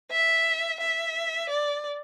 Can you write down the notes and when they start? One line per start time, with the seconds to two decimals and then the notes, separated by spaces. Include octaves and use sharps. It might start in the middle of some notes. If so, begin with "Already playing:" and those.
0.11 E5
0.80 E5
1.50 D5